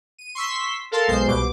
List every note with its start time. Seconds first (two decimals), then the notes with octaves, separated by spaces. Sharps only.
0.19 D#7
0.35 C6 C#6 E6 B6
0.91 A4 A#4 F5 A5 C6
1.08 B1 G#3 C5 C6 G6
1.26 C2 B2 D6